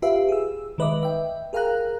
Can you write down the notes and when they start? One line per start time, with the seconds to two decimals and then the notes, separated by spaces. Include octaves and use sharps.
0.02 F4 G4 B4 E5 F5
0.29 G#4 E6
0.78 D#3 G#3 B4 D#5 E5 D6
1.03 E5 G5
1.53 G#4 A#4 F5 G5 A#5 F#6